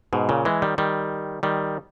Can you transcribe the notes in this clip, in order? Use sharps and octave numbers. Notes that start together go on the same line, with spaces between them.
G#2 B2
A#2 C#3
E3 G#3
D#3 G3
D#3 G3
D#3 G3